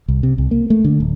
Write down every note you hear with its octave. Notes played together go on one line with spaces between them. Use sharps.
C2
C3
C2
A#3
A3
D3
D1